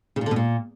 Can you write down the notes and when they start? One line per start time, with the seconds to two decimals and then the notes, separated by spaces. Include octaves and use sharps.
0.16 C#3
0.21 A#2
0.26 D3
0.31 B2
0.36 A#2